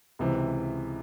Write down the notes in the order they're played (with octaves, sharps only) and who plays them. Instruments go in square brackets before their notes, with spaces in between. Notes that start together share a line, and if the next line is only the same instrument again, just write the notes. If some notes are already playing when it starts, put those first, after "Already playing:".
[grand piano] C#2 C3 E3